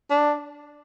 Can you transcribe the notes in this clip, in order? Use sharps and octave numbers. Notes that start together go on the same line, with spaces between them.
D4